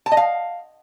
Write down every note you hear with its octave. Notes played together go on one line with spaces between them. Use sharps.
A5
D#5
F5